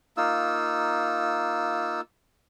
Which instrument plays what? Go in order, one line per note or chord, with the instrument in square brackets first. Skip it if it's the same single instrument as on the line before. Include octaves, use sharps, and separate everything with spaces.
[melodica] A#3 D#4 F4 E6